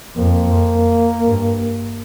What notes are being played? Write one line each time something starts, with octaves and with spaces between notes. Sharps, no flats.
F2 A#3
G2